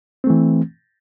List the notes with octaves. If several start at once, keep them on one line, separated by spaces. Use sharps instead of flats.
E3 A3 C4